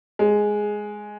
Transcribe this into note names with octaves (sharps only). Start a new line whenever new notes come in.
G#3